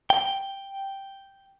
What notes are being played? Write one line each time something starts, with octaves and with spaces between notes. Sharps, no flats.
G5